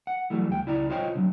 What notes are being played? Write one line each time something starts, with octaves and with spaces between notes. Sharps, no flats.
F#5
E3 F#3 G3 A3
D2 G5
C#2 E4 D5 A#5
F4 C5 C#5 D#5 G5
D3 F3 F#3